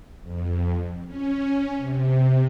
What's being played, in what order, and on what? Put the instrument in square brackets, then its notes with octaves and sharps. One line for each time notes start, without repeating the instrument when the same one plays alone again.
[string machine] F2
C#4
C3